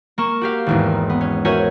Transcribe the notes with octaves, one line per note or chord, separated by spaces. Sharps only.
A#3 C#6 E7
F#4 G4 F5
G#1 E2 G#2
B3
C#4
F#4 A#4 C5 C#5 E5 G#5